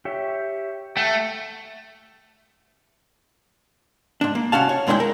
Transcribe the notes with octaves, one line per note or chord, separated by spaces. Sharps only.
G4 C#5 E5
A3 E5 F#5 G5
G#2 D4
A#3
C2 C#4 F#4 F5 A5
C#5
G2 G#3 A#3 D4 E4 G5
A#4